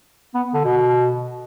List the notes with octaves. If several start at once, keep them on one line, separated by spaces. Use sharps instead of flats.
B3
D3
B2